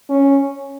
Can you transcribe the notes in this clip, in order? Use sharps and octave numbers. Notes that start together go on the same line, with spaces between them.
C#4